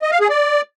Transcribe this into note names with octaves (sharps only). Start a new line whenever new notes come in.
D#5
F5
G#4
D5